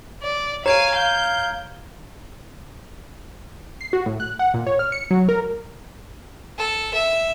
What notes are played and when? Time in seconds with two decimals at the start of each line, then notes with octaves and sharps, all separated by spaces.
0.22 D5
0.66 C#5 F5 G#5 A#5 G#6 D7
0.96 F5 G6
3.81 C7
3.93 F#4
4.06 A2
4.20 F#6
4.39 F#5
4.54 A#2
4.67 C#5
4.79 F6
4.92 C#7
5.11 F#3
5.29 A#4
6.58 A4
6.93 E5